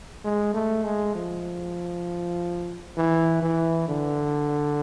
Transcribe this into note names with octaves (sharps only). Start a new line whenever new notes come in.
G#3
A3
G#3
F3
E3
E3
D3